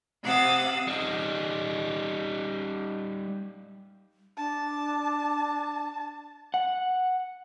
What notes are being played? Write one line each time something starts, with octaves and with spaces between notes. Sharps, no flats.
C3 F5 F#5 D#6 E6 A6
G3 D#4
D4 A5
F#5